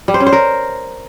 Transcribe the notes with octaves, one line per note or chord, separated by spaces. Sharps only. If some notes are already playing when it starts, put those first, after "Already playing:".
G3
C5
C#4
C5
A#4